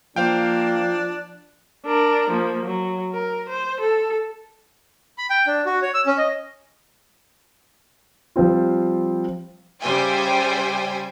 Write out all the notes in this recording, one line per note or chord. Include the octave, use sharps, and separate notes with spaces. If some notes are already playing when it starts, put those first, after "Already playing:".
F3 A#3 D4 C5 F5 G5
D4 A#4
F3 A#3
F#3
A#4
C5
A4
B5
G5
D4
F#4
C#5
E6
C#4
D#5
F3 G3 C4 F4
C#3 G3 C5 E5 G5 G#5